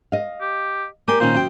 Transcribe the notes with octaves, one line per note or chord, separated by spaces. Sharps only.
D#5 F5
G4
A#3 G4 D5 G#5 C6
A#2 D#3 C#4 C5
F#2 G5